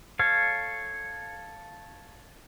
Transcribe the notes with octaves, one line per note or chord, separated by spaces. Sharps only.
A4 C#5 F5